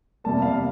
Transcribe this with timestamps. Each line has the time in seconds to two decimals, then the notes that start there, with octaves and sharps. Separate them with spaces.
0.24 E2 C3 G3 A#3 A5
0.42 F5
0.54 F5